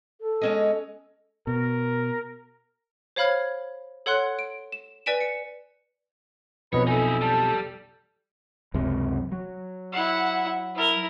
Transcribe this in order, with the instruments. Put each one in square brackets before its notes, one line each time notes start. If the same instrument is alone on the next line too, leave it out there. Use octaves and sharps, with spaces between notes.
[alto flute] A4
[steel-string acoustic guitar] G#3 C#4 D#5
[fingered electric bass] B2 [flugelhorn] A#4
[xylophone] C5 C#5 F5 B5 F6 G#6
A4 C#5 F#5 C6 F#6
D7
E7
B4 D5 G#5 B6 D7 E7
C#7
[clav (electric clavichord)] B1 F2 D#5 [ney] B4 [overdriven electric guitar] C#5 [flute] B5
[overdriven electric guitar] D#4 E4 [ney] A4 [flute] G#5
[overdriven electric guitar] G3 [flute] A5
[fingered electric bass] C#2 F#2 C3
F#3
[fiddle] E4 F#5
E4 A#4